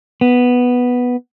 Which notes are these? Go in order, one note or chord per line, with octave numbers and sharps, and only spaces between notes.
B3